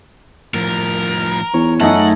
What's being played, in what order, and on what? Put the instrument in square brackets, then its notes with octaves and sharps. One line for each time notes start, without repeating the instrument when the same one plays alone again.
[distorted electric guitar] A2 F3 [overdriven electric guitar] A#4
[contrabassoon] E2 [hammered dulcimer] C#5
[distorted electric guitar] F#2 [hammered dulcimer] A3 D#4 G#4 [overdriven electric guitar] F#5